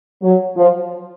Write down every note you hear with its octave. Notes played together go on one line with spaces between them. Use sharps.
F#3
F3